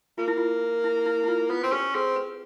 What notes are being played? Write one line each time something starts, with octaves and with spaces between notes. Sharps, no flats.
A#3 F4
E4
F4
E4
E4
E4
F4
B3 F4
C4
C#4 G4
C4 G#4
B4